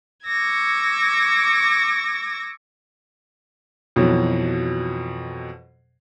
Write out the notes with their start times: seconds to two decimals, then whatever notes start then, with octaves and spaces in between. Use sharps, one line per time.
0.27 C#6 D6 E6 G#6 A#6
3.96 F2 B2 E3 F#3